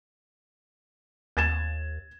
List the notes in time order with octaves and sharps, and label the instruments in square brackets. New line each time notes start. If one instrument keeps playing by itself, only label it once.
[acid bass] D#2 [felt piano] G#6 A6 E7